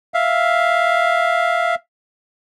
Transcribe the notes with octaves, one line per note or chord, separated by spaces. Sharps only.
E5 F5